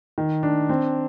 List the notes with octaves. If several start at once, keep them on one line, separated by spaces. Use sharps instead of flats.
D#3
D4
C4